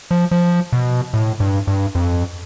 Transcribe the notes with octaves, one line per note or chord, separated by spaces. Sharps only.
F3
F3
B2
A2
G2
G2
F2